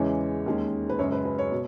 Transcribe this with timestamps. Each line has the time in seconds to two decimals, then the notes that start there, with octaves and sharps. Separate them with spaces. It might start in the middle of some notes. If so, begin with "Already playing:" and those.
Already playing: E2 C#3 E3 G#3 C#4 C#5
0.46 D#2 D#3 G#3 C#4
0.90 B4
0.99 F#2 C#3 G#3 C#5
1.12 B4
1.25 B4
1.39 C#5
1.52 B2